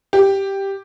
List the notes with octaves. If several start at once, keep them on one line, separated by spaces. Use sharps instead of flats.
G4